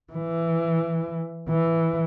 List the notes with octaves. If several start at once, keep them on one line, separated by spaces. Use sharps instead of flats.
E3
E3